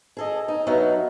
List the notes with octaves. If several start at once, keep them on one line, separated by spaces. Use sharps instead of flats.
G#4 A4 D#5
D#4
G2 F#3 B3 D#4 A#4 E5